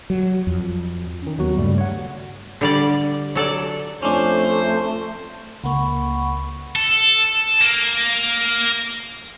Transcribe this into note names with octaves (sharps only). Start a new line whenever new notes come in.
F#3
F2
D#3 C#4
D#2 F#3 B3 F#4
G2 C#3 G3 A3
C#5 F#5
D3 G3 D5
F#3 A4 D5
F2 A3 C#4 D4 C5
C#2 A#3 F#5 B5 C#6
A4
A#3